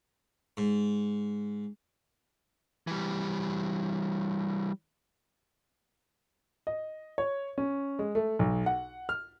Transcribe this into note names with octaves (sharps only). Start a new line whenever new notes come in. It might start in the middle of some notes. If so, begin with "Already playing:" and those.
G#2
E3 G3
D#5
C#5
C#4
G#3
A3
B1
F#5
F6